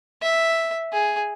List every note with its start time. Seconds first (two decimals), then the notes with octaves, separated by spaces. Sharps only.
0.22 E5
0.93 G#4